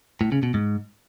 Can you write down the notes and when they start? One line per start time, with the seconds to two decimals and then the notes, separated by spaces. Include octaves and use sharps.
0.21 A2
0.32 C#3
0.43 B2
0.54 G#2